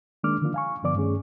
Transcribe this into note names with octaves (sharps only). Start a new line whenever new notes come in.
D#3 G#3 A#3 D4 D6 F6
D3 D#3 F3 A#3 D4 F4
F5 G#5 C#6
G2 D3 F3 B3 D5 D6
G2 D#3 A3 C#4 G#4